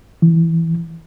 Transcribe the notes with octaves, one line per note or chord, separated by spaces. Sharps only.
E3